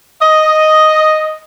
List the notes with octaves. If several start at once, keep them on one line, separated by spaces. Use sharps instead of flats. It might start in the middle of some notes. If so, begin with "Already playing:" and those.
D#5